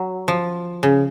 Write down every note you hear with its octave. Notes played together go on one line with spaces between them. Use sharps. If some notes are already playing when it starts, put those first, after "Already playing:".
Already playing: F#3
F3
C#3